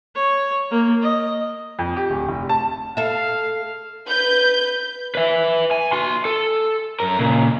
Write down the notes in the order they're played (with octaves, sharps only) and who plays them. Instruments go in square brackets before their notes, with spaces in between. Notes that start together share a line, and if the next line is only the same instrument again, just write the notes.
[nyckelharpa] C#5
A#3
D#5
[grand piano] F2
G4
D1
F1
A5
[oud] A4 E5 [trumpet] F5
[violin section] B4 G6
[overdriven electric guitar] B4 E5
G#5
F#4 C6
A4
F#2 A#4
A#2 C#3